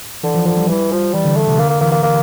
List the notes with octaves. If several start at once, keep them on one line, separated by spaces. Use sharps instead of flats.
D3 E3
F3
D3 F3
G3
E3 G3
F3
E3 G3
D3
A3
C3
D3 A#3
A#3
E3 A#3
A#3
A#3